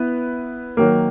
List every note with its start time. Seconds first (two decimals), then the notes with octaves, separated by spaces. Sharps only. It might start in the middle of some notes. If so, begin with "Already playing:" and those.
Already playing: B3 E4 B4
0.77 D#3 F#3 A#3